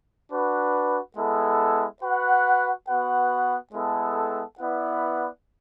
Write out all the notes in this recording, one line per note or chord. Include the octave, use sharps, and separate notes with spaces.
D4 F#4 B4
G#3 B3 E4 A4
F#4 B4 F#5
B3 F#4 B4 F#5
G#3 B3 E4 A4
B3 E4 B4 D5 F#5